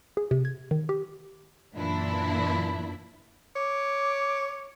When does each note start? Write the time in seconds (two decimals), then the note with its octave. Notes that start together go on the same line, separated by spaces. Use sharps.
0.17 G#4
0.31 C3
0.45 G#6
0.71 D#3
0.89 G4
1.76 F#2 A#2 E3 D4 E4
3.56 C#5 D6